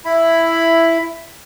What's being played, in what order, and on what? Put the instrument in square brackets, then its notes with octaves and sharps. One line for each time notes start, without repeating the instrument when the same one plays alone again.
[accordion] E4 B5